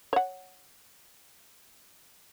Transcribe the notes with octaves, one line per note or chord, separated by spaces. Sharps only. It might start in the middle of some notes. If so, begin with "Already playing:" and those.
C#5 F#5